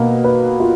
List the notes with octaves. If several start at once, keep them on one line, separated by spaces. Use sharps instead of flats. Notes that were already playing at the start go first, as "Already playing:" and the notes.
Already playing: B2 A#3
B4
F4